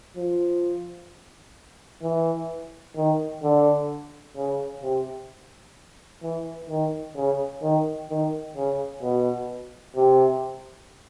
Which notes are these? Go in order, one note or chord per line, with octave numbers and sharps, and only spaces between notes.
F3
E3
D#3
D3
C#3
C3
E3
D#3
C#3
D#3
D#3
C#3
B2
C3